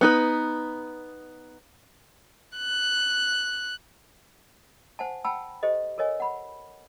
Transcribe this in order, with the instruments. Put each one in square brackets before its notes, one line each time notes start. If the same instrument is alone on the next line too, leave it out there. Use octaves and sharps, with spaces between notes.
[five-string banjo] B3 D#4 B4
[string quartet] F#6
[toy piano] C5 F#5 G#5 A5
F#5 G5 A5 B5 E6
G4 A4 C5 D#5
A4 A#4 C#5 D#5 G#5
F#5 B5